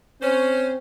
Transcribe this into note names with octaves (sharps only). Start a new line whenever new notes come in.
C4 C#4 C5